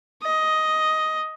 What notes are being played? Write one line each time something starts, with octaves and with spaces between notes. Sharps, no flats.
D#5